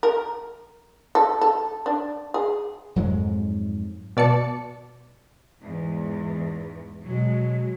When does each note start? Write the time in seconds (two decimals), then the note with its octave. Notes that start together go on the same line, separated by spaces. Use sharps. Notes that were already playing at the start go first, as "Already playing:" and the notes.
0.03 A#4
1.15 A4
1.41 A4
1.86 D4
2.34 G#4
2.96 F2 G#2 F#3 G#3
4.17 B2 D5 A5 C#7
5.60 E2 G#2
7.05 B2 F#3 G#3